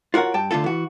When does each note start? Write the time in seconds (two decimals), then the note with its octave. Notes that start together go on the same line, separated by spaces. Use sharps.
0.14 F4 F#4 A#4 C#5 F#5
0.34 G2 G5 A5
0.51 D3 A3 F4 A4
0.64 E3 F#4